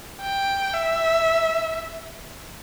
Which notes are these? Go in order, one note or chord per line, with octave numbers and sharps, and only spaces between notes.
G5
E5